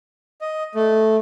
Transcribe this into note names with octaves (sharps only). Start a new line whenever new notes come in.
D#5
A3